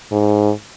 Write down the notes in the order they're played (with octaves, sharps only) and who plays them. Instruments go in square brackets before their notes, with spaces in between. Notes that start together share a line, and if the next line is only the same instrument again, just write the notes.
[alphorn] G#2